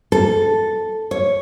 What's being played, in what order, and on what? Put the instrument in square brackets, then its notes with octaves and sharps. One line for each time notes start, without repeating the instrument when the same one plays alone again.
[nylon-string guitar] A4
C#5